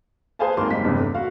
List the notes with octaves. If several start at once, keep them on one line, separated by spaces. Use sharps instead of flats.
G#4 B4 C5 F5 G#5 A5
G#1 A#3 A#4 C6
F#1 G3 G#3 B6
G1 E2 G2 C3
A3
F#4 F5